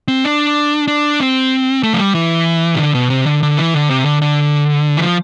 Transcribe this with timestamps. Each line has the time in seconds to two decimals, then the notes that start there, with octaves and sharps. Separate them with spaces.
0.08 C4
0.24 D4
0.88 D4
1.20 C4
1.83 A3
1.94 F3
1.99 G3
2.15 E3
2.75 C3
2.78 D3
2.95 B2
3.10 C3
3.26 D3
3.43 D3
3.58 E3
3.74 D3
3.90 C3
4.05 D3
4.22 D3
4.97 E3
5.02 F3